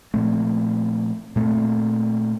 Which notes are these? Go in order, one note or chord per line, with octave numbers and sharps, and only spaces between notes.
A#2 F3 A3 C4
A#2 A3 C4